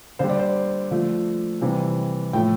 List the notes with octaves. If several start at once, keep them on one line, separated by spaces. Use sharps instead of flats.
D3 G3 C5
D5
C5
D3 F3 A3
C3 E3 G3
A2 F3 A3 G5